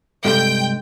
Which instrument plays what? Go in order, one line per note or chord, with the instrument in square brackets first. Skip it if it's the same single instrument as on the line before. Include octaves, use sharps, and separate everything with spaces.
[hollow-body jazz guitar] G2 C3 [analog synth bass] G#3 [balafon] A4 [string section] G5